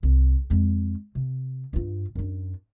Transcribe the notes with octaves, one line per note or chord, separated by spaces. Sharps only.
C2
F2 G#3
C3
G2 F4
F#2 D4